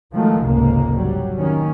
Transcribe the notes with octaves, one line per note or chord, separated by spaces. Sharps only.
D#3 F3 F#3 G#3 A3
F1 C#2 G#2 G#3 A#3
F#3 G3
D#3 A#3 C#4